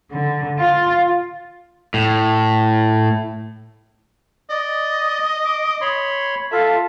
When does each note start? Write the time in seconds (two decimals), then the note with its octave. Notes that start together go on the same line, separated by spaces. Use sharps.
0.12 D3
0.60 F4
1.94 A2
4.50 D5 D#5
5.45 D6
5.81 C#5 B5 C6
6.51 F4 A4 E5 F5